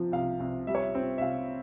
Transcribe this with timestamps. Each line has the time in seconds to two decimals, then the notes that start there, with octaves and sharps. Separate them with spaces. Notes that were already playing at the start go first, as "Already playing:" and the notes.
Already playing: C3 F3
0.12 C2 F5
0.40 C2
0.67 G3 E5
0.75 C#5
0.82 E5
0.95 C4
1.18 E5
1.21 C3 F5